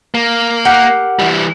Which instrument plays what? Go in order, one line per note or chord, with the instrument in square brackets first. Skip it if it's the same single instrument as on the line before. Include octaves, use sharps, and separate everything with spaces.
[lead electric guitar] A#3
[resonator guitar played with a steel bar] G4 A#4 F#5
[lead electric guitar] E3 G3